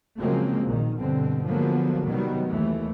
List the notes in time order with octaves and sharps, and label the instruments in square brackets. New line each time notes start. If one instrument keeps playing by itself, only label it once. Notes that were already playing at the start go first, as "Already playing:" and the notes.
[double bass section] C#3 F3 F#3 G#3 A#3 C4
A#1 A#2 D#3
G2 B2 D3 C4
D3 F3 F#3 G#3 A#3 B3
C3 D#3 F#3 G3 B3
D#2 E3 A3